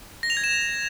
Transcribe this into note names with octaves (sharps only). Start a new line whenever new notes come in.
A#6
F7
G#6
E7